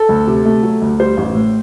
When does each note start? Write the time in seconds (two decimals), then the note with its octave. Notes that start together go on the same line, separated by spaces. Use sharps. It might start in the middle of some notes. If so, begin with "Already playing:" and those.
Already playing: A4
0.09 D2
0.27 C3
0.45 A3
0.63 F#3
0.82 D2
1.00 G3 C5
1.17 A1
1.35 A2